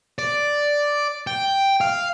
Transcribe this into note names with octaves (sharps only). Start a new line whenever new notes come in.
D5
G5
F5